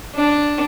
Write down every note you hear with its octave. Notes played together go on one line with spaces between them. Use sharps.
D4